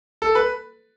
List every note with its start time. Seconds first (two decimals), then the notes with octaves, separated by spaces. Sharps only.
0.22 A4
0.35 B4